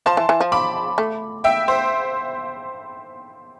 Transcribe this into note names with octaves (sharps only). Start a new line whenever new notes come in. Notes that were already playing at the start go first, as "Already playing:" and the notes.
F3 A5 C6
E3
E3
F3
B5 D6
A3
E5 G5
C5